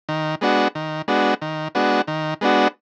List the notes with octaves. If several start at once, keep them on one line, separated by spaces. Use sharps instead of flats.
D#3
G#3 B3 D4 F#4
D#3
G#3 B3 D4 F#4
D#3
G#3 B3 D4 F#4
D#3
G#3 B3 D4 F#4